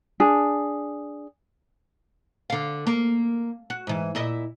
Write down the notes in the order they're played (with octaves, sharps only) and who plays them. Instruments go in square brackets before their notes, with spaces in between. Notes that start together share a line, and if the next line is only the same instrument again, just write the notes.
[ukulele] D4 G#4
[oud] D3 F5
A#3
F#4
G#2 E3
A#2 E4 D#5